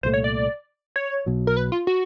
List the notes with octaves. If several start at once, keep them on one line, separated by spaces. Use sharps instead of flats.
C2 A#2 F3 A3 C5
C#5
D5
C#5
B1 B2 F#3
A#4
B4
F4
F#4